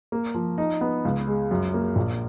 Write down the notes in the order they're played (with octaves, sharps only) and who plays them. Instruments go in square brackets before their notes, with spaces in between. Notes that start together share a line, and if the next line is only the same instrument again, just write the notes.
[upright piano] A#3
F3
D#4
B3
C#2
G#3
F#2
A#3
A#1